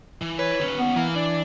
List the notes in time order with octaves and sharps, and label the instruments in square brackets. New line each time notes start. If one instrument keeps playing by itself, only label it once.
[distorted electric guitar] E3
[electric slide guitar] B4 [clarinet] C#5
[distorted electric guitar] D#2 C#4
[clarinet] B3
[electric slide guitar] E3 [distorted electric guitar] A#4 F5
[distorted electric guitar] D4 [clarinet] D5